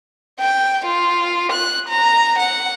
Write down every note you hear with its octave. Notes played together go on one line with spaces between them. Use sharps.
G5
F4
F#6
A#5
F#5